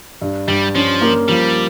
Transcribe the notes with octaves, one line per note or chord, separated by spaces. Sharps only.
G2
G2 G3
F3 C#4
A#3
F3 G3